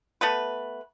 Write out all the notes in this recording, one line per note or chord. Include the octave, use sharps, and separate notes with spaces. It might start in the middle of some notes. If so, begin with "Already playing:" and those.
A3 B3 B4